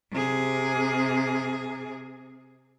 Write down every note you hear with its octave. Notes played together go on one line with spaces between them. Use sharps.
C3 G#4